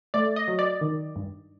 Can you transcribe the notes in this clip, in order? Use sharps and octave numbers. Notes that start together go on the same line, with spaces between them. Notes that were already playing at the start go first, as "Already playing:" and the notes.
A3 D5
D#5
F#3
D5
D#3
G2